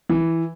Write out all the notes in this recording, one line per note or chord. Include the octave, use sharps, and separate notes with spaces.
E3